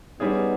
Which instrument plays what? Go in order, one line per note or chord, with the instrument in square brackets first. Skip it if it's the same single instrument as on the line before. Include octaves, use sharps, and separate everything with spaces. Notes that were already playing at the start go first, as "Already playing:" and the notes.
[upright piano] G3 C#4 G#4 [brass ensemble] B3 D#4